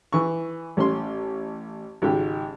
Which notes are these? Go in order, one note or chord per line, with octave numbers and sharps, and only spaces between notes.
E3 C#6
A1 C#4 C6
G#1 G#2 C#3 G4